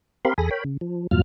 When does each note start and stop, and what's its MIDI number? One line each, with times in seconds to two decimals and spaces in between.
0.25 0.34 60
0.25 0.34 67
0.25 0.34 70
0.25 0.34 77
0.25 0.34 83
0.25 0.34 84
0.38 0.50 40
0.38 0.50 68
0.38 0.50 69
0.38 0.50 80
0.38 0.50 83
0.38 0.50 94
0.51 0.64 70
0.51 0.64 73
0.51 0.64 79
0.51 0.64 83
0.64 0.77 49
0.81 1.07 53
1.11 1.22 40
1.11 1.22 43
1.11 1.22 46
1.11 1.22 54
1.11 1.22 65
1.11 1.22 89